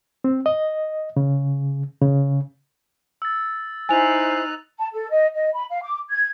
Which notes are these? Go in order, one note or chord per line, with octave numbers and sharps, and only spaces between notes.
C4
D#5
C#3
C#3
E6 A6
D#4 E4 C5 G#5 F#6 A6 F7
A5
A4
D#5
D#5
B5
F5
D6
G#6